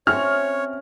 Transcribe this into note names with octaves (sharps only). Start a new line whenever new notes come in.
C4 C#4 F#4 C#5 E5 F6